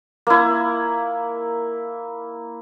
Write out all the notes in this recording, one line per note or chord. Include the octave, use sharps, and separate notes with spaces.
A#3 E4